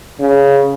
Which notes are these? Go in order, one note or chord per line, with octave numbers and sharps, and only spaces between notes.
C#3